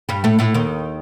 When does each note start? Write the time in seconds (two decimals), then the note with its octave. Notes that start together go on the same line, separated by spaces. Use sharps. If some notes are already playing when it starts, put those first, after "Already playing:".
0.09 G2 G3
0.24 A2 A3
0.39 A2 A3
0.54 D#2 D#3